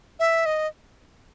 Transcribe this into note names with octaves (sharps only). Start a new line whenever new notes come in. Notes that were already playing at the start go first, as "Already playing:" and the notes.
E5
D#5